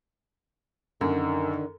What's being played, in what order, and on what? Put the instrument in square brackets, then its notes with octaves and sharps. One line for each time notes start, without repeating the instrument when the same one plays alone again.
[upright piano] F#2 [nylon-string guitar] D3 [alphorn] D#3